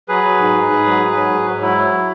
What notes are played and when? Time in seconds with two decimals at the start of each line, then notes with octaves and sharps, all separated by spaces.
0.09 F#3 G#4 B4
0.24 F#3
0.40 G#2
0.55 G#2
0.70 G#2
0.85 F#3
1.01 G#2
1.16 F#3
1.31 G#2
1.47 G#2
1.62 F#3 E4
1.77 F#3